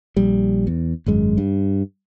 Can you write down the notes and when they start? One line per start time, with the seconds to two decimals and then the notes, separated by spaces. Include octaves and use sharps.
0.17 A#1 G3
0.67 E2
1.06 G#1 F#2 G#3
1.38 G2